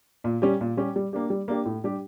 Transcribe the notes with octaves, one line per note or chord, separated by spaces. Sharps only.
A#2
G3 C#4 G4
A#2
G3 C#4 G4
G3
A#3 D4 G4
G3
A#3 D4 G4
A2
G3 D4 G4